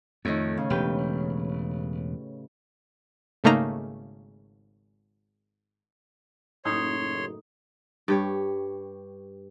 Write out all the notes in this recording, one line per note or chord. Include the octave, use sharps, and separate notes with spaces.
F2 A2 D#3
C#3
E1 G4 B4 G5
G#1 C#3 A3 A#3 D#4 A#5
F#1 A2 D#4 C#5 C6
G2 G4 C#5